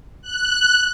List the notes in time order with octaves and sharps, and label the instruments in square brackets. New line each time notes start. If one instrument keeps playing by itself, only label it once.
[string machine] F#6